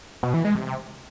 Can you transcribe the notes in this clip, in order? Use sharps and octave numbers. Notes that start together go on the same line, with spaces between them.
B2
E3
G#3
C3